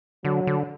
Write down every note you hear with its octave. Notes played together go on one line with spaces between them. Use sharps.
D3 F#3
D3